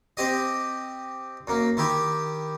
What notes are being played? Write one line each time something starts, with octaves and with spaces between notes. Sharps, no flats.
C4 G4 D#5
F#2 A#3
D#3 E4 G4